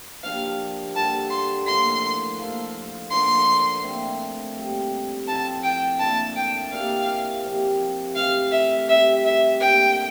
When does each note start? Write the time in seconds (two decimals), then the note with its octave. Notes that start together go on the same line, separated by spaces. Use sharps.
0.23 F3 A#3 D4 G4 F5
0.95 D3 G3 A#3 D4 A5
1.31 C6
1.67 A2 F3 A#3 D4 C6
2.39 F3 A#3 F4 A4
3.11 D3 F3 A#3 C6
3.84 A#2 A3 C4
4.56 A#2 G3 C4
5.28 A2 F3 C4 A5
5.64 G5
5.99 A#2 A3 D4 A5
6.36 G5
6.72 A#3 E4 G4 D5 F5
7.44 C3 F3 A#3
8.15 C3 E3 A3 F5
8.52 E5
8.88 C3 G3 C4 E5
9.24 E5
9.60 D3 G3 A#3 G5